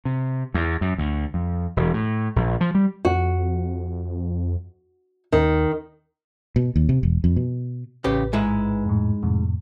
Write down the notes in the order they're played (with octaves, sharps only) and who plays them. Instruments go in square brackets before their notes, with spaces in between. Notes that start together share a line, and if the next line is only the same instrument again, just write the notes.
[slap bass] C3
E2
F#2
D2
F2
E1
A2
A#1
F3
G3
[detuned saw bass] F2 [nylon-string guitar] F#4
[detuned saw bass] D#2 [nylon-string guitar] D#3
[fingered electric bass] B2
D#2
C3
E1
F2
B2
[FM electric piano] A1 B4 [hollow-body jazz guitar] C#3 G4
[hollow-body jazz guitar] G#2 G#3 E4
[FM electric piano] F2 A2
F2 A2 C3